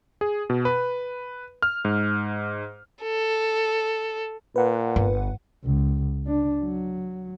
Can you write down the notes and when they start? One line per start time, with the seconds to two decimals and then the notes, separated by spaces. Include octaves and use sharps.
0.21 G#4
0.50 B2
0.65 B4
1.62 F6
1.85 G#2
3.03 A4
4.56 A#2 B4 F#5
4.96 G1
5.64 C#2
6.27 D4
6.63 F#3